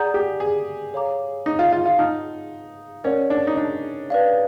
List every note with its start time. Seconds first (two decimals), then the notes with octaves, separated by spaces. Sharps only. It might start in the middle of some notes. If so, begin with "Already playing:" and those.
Already playing: G#4 D5 F#5 A#5 D#6 G6
0.14 G4
0.40 G#4
0.93 A4 C#5 F5 A#5 D6
1.46 D#4
1.59 F4
1.72 F4
1.86 F4
1.98 D#4 F#5 A5 C6 F6
3.04 C#4 A#4 D5 F#5
3.30 D4
3.47 D#4
3.57 D4
4.10 B4 D5 F5